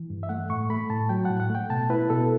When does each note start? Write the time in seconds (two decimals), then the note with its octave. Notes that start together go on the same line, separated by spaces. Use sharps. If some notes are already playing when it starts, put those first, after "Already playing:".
Already playing: E3
0.10 G2
0.23 E5
0.29 A3 F#5
0.50 A2 C#6
0.69 A3 B5
0.90 A2 A5
1.09 F#3 G5
1.25 F#5
1.30 A2
1.40 F#5
1.50 A3 G5
1.70 B2 A5
1.90 E4 B4
2.10 B2 A4